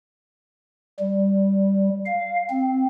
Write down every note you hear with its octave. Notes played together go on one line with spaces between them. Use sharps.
G3
F5
C4